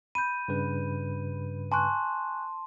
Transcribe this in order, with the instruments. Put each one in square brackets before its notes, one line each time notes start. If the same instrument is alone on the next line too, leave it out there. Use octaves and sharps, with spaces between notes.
[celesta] B5 G6 [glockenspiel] D#7
[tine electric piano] G2 C#3 B4
[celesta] G#5 C#6 F#6 [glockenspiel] A5 C6